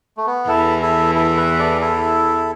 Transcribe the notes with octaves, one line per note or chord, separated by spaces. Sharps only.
A3
B3
E2 E3 E4 A4
E4 A4
E4 A4
B4 E5
A4 D5
E4 A4